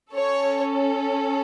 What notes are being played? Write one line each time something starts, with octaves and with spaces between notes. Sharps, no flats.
C#4 A4 C#5